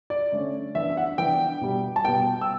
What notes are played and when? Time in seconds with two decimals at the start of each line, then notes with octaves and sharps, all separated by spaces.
0.10 D5
0.32 D3 A3 C#4
0.75 E3 B3 D4 E5
0.90 E5
0.97 F#5
1.18 E3 B3 D4 G5
1.61 B2 G3 B3
1.96 A5
2.04 B2 G3 B3 G5
2.42 E6